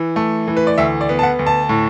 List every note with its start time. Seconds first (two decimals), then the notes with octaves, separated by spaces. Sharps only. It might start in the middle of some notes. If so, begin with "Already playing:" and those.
Already playing: E3
0.16 A3
0.48 E3
0.57 B4
0.67 D5
0.78 D2 E5
1.01 D5
1.09 B3
1.19 A5
1.23 F#5
1.39 D2
1.46 A5
1.69 A2